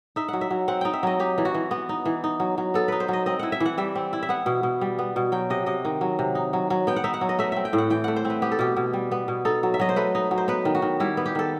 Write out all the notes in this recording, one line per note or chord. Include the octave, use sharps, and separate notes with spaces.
D#4 E5
F#3 F#5
E5
F#3
C4 F#5
D#4 G5
E5
F#3 D#5
D#4 G4
E3
F#4
E3
B3
D#4
E3
D#4
F#3
F#3
B3 A4
D#4 B4
C5
F#3 D#5
C4 D#5
E4 F#5
E5
E3
F#5
G3 E5
C4
E4
E5
B3 F#5
B2
B2
G3
B3
B2
F#3 G5
C3 D#5
C3 D#5
D#3
F#3
C3
D#4
F#3
F#3
B3 G5
F#5
D#4 E5
F#5
F#3
D#5
A3 E5
C4 E5
G5
A2
F#5
E3 G5
A3 F#5
C5
C4
B4
B3 G4
A4
B2 G4
B2
G3
B3
B2
D#4 A4
F#3
E5
F#3 D#5
C5
A3 B4
D#4
F#3
C5
B3 B4
D#3
F#4
D#3
G3 E4
B3
G4
D#3 A4